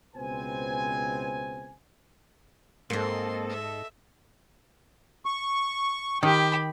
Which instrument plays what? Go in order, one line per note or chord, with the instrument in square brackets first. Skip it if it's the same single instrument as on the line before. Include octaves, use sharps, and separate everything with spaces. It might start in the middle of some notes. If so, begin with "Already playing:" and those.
[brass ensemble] C#2 B2 C4 B4 C5 G#5
[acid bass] G#2 [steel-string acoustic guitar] A#3 C4 [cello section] A4 D#5 [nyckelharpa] C6
[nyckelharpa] E5
[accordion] C#6
[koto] D#3 [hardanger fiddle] G4 B5